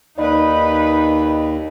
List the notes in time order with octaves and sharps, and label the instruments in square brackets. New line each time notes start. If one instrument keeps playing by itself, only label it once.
[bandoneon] D#2 [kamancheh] D#4 B4 [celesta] D5 D#5 B5